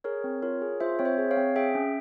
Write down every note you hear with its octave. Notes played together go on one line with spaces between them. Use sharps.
G#4 A#4 C#5
C4
F4 A#4 C#5
G#4
F4 C5 E5
C4 C#5
C5 E5
G#4
C#5 F5
C4
G#4 E5 G5
C#4